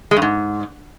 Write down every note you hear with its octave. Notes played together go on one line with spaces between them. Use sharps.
G#3
G2
G#2